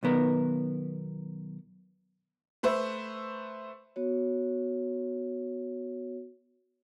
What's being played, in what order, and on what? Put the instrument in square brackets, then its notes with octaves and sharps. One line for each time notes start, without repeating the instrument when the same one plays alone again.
[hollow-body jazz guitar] B1 D#3 B3 A#4
[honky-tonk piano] A3 B4 C5 E5
[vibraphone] B3 F#4 C#5